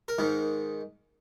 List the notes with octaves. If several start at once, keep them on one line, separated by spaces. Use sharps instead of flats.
A#4
G#2 D#3